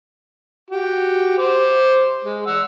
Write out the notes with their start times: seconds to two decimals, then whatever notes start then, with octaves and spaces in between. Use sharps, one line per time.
0.70 F#4 G4
1.38 C5 D6
2.25 G#3
2.46 F#5 E6